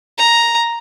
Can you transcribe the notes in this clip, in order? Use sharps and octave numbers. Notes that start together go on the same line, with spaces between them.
A#5